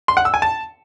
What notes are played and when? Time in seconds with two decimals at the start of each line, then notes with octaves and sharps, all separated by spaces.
0.08 C6
0.17 F#5
0.25 E6
0.34 G#5
0.42 A5